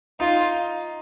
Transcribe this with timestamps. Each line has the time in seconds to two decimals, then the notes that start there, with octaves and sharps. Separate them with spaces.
0.20 D#4 F4